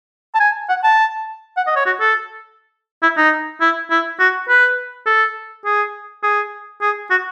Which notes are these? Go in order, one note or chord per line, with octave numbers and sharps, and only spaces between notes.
A5
G#5
F#5
A5
F#5
D#5
C#5
F#4
A4
E4
D#4
E4
E4
F#4
B4
A4
G#4
G#4
G#4
F#4